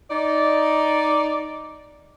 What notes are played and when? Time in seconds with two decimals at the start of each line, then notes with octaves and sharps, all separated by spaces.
0.10 D#4 D5